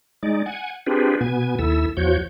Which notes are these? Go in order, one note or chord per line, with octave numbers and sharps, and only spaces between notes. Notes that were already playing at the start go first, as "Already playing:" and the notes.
G#3 D#4 D5
F#5 G#5
C4 D4 F4 G4 G#4 B4
B2 B3 G#5
D#2 E4 A4 E6
E2 F3 F#4 C#5 G6